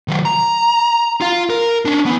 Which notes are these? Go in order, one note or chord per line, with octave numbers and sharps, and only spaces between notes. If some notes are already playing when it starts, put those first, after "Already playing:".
D#3 F#3
A#5
F4 F5
A#4 A#5
C#4 D4
B3 E4